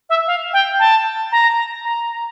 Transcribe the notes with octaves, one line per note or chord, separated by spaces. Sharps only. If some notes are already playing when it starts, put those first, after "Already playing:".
E5
F5
G5
A5
A#5
A#5